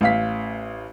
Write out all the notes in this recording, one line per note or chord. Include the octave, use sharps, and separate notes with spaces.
A1 F5 B6